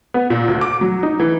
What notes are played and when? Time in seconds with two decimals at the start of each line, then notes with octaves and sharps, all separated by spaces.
0.14 B3
0.30 A#2
0.48 D2
0.61 D6
0.81 F#3
1.03 D#4
1.20 E3